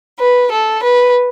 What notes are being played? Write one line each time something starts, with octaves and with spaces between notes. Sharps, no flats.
B4
A4
B4